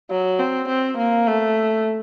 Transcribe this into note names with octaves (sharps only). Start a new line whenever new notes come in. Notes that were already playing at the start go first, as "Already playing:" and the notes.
F#3
C4
C4
A#3
A3